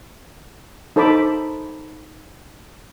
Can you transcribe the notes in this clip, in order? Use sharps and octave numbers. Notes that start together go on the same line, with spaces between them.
D#4 A4 C5 A5 B5 D6